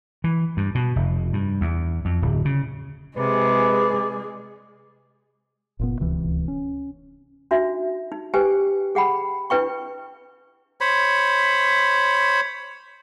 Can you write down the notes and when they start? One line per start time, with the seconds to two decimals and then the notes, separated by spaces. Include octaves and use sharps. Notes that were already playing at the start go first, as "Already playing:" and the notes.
0.24 E3
0.57 G2
0.75 B2
0.96 F1
1.33 G2
1.61 E2
2.05 F2
2.22 D1
2.45 C#3
3.17 C3 G#3 G#4 B4 D5
5.79 F#1 A#2 B3
5.99 D1 C#2 C3 E3
6.48 C#4
7.51 D4 D#4 F#4 E5
8.12 D#4
8.34 G4 B4 C5 G5 G#5
8.95 G#4 F#5 G5 B5
9.50 D4 E4 B4 G5 C#6
10.81 C5 C#5 B5